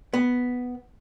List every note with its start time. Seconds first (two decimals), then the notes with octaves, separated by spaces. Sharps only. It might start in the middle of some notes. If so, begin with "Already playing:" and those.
0.14 B3